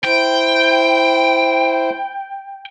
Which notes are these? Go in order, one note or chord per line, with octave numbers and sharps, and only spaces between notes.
E4 C5 G5